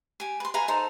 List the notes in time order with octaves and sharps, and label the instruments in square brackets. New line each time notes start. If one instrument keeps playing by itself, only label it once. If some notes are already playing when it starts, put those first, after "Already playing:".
[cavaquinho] G4 G#5
B4 C6
B4 F5 G#5 A#5
D#4 A4 C5 A#5